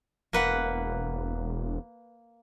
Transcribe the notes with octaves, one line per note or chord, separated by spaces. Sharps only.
E1 A#3 B4 F#5